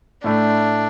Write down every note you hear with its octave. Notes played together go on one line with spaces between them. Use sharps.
A2 A3 D4 E4